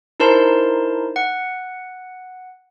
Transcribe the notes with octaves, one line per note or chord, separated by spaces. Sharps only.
D#4 E4 A#4 C5 A5 C6
F#5